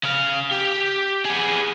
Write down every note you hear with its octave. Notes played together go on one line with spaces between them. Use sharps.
C#3 F5
G4
B3 G#4